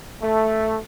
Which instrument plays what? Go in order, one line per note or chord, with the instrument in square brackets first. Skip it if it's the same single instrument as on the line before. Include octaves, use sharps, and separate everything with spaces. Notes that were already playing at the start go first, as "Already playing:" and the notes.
[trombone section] A3